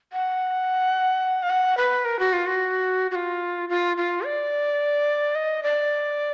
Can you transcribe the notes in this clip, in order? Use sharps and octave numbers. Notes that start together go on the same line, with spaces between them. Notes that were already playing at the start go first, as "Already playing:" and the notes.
F#5
F5
F#5
B4
A#4
F#4
F4
F#4
F#4
F4
F4
F4
D5
D#5
D5